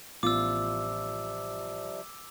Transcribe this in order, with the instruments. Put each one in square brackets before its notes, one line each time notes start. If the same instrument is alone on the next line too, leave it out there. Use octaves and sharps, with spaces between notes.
[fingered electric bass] A1 B3 [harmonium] C3 F3 G3 [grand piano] F4 [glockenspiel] D6 E6